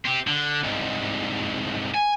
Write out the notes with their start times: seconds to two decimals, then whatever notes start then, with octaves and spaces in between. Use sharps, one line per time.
0.05 C4 G4
0.27 D3
0.63 C2 G#2
1.94 G#5